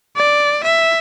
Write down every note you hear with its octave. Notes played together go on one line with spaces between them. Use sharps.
D5
E5